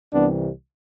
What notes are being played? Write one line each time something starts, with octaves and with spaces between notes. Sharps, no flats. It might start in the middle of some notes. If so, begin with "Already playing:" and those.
C2 C3 E3 G3 B3 D4